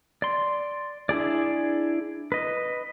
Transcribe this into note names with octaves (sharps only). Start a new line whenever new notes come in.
D5 C6
D4 E4 G#4 D5
B4 D#5